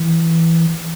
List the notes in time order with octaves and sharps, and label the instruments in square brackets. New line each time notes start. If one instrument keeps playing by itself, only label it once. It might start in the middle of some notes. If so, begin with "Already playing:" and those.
Already playing: [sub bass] E3